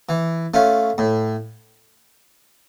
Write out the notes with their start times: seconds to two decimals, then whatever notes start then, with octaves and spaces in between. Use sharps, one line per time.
0.09 E3
0.54 A3 C#4 F4
0.98 A2